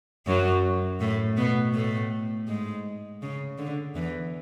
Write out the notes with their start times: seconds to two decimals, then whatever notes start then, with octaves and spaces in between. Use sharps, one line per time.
0.27 F#2 F#3
1.00 A2 A3
1.37 B2 B3
1.74 A2 A3
2.48 G#2 G#3
3.22 C#3
3.58 D3
3.95 E2 E3